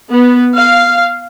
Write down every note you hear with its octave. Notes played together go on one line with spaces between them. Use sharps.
B3
F5